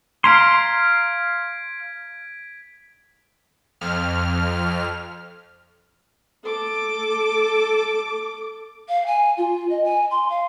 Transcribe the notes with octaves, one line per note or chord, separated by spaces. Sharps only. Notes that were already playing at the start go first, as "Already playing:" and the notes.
F5 A#5 C6 G#6 B6 D7
F2 F6
A4 D6
F5
G#5
F4
D#5
G#5
C6
F5